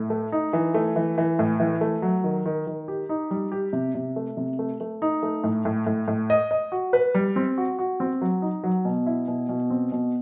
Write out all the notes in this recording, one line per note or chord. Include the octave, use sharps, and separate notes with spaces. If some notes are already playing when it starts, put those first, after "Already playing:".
Already playing: A2
A3
D#4
E3
A3
E3
E3
A2
E3
A3
F#3
D#3
D#3
D#3
G4
D#4
G3
G4
C3
C3
A3
C3
A3
A3
D#4
A3
A2
A2
A2
A2
D#5
D#5
F#4
B4
G3
C4
F#4
F#4
C4
F#3
D#4
F#3
B2
E4
B2
B2
C4
B2